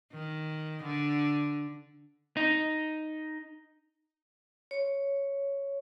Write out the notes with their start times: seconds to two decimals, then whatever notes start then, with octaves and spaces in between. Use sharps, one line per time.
0.12 D#3
0.83 D3
2.37 D#4
4.71 C#5